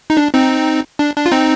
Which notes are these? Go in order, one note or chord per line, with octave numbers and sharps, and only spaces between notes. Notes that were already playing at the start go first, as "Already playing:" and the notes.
D#4
D4
C4 D#4
D4
D4
F4
C4 D#4